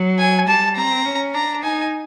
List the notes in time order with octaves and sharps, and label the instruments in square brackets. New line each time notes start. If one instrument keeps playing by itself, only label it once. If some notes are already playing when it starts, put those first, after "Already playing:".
Already playing: [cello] F#3
[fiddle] G#5
[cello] G3 [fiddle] A5
[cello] C4 [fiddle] A#5
[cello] C#4
[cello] D4 [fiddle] A#5
[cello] D#4 [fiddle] G#5